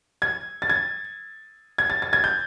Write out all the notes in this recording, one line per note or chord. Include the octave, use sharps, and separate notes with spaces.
G#6
A6
G#6
G#6
A6
A6
G#6
G6